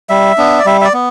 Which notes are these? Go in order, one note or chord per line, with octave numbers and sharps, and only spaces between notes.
G3 E5
B3 D4
D5
G3 E5
E5
D5
B3